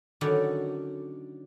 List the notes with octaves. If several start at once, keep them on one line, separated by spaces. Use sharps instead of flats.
D3 D#3 F#3 C#4 D5 B5